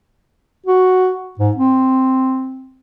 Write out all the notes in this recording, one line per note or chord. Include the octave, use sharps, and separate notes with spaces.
F#4
G#2
C4